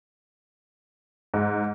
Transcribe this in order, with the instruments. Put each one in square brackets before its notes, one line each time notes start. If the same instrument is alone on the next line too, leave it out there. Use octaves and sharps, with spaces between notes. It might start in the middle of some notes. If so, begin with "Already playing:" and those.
[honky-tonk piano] G#2